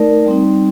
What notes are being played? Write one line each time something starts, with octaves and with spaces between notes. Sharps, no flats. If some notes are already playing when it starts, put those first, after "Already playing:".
Already playing: A3 D#4 A#4 D5
G3 C4 D#4